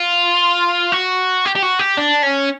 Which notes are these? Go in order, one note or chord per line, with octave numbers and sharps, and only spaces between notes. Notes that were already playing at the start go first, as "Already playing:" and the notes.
Already playing: F4
F#4
G4
G4
F#4
G4
D4
C#4